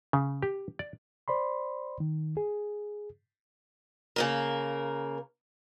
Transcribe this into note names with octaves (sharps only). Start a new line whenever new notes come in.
C#3
G4
D5
C5 D5 B5 C6
D#3
G#4
C#3 A#3 A#4